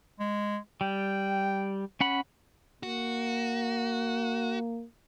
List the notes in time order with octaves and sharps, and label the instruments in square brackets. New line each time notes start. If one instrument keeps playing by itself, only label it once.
[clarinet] G#3
[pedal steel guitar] G3 [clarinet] G5
[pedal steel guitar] C#4 F#5 B5
[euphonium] A#3 [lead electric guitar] F#4